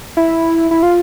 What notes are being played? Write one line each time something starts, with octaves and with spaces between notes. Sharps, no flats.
E4
E4
F4